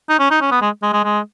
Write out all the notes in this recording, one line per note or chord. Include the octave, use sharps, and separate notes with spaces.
D#4
C#4
D#4
C#4
B3
G#3
G#3
G#3
G#3